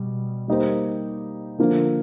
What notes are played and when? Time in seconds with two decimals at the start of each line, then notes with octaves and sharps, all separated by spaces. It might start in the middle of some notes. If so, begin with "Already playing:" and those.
Already playing: B2 G3
0.48 G3 A#3 D#4 G4 C5
1.59 D3 F3 A#3